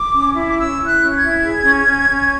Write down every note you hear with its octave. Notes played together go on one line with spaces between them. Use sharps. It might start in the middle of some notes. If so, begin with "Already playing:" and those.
Already playing: D6
C#4
E4
D6
C#4 E6
E4
F#6
C#4
G#6
E4
G#4
C#4
C#4
C#4